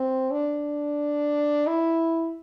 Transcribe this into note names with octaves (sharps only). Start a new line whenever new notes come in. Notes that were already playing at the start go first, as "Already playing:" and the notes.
Already playing: C4
D4
E4